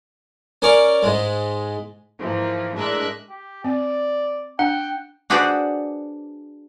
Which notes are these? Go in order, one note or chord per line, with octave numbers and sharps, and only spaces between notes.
C#4 A#4 D5 C#6
G#2 G#3
G#2 E3 F3 A#3
A2 G#3 D4 A#4 E5 F#6
G4
C4 D5
D4 F#5 G5
D4 F#4 G#4 B4 C5 D5